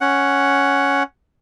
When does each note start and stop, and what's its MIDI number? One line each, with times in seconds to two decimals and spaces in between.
0.01 1.03 61
0.01 1.03 78